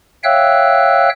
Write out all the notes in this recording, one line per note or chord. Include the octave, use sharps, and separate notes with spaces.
C#5 E5 F5 G5 E6 F#6